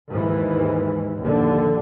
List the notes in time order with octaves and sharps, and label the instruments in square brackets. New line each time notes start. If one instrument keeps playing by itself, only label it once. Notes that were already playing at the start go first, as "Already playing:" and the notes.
[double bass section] D#2 G#2 E3
A#1 D#2 D3